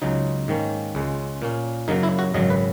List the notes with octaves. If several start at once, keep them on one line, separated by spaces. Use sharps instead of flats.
C#2 C#3 F#3 D#4
G#2 D#3 A#3 C#4
C#2 C#3 G#3
A#2 A#3 C#4
F#2 C#3 F#3 A#3 D#4
E4
F#4
G#1 F#2 C#3 F#3 D#5
B4